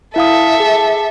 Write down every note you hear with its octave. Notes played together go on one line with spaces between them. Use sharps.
E4 A4 E5 F5 D#6
G#4